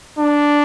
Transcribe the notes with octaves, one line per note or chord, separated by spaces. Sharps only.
D4